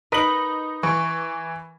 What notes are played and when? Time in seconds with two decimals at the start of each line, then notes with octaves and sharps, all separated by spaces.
0.12 D#4 A#4 B4 F#7
0.83 E3 C#6